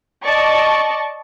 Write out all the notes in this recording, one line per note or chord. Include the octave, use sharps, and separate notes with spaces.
D5 D#5 A5 C#6